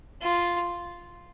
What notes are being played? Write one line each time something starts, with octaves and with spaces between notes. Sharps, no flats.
F4